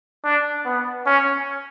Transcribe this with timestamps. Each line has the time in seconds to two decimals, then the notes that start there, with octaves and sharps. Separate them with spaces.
0.24 D4
0.65 B3
1.06 C#4